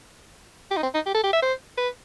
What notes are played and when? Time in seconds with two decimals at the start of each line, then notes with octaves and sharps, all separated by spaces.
0.71 G4
0.77 D#4
0.83 C4
0.95 D#4
1.06 G4
1.15 A4
1.24 G4
1.33 E5
1.42 C5
1.78 B4